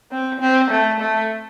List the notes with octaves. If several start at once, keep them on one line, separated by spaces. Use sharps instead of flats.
C4
C4
A3
A3